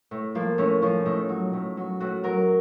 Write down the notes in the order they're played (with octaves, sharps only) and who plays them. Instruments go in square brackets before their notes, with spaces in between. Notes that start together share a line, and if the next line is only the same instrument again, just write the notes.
[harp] A2
F3 A#3
A2 C#4
F3 C#4
A2 D#4
F#3
A2
F#3
A2 F#4
F#3 A#4